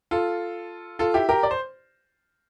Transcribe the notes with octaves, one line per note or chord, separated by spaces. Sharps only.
F4 A4
F4 A4
E4 G4
G4 A#4
D5
C5